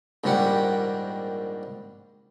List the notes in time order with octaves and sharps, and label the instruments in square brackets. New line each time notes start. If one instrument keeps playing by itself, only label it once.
[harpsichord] A#1 G#2 D#3 G3 G4 F#5